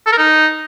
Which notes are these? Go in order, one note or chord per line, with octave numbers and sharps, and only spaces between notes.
A4
A#4
D#4